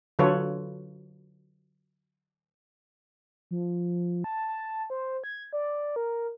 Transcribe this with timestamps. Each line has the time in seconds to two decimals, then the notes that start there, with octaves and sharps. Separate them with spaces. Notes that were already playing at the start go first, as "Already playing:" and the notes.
0.19 D3 F#3 F4 A4 B4 C#5
3.51 F3
4.24 A5
4.48 A5
4.90 C5
5.24 G#6
5.53 D5
5.96 A#4